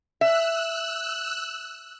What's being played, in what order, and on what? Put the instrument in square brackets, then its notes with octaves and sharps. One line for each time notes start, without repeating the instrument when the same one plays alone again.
[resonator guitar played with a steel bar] E5 [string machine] E6 F#6